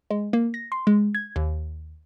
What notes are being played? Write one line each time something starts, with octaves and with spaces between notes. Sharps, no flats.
G#3
A#3
A#6
C6
G#3
G#6
D#2